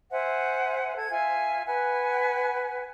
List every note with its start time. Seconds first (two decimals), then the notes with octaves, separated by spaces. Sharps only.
0.11 C5 E5 F#5 G#5
0.96 A4 G#6
1.10 F4 E5 G#5
1.66 B4 F#5 G#5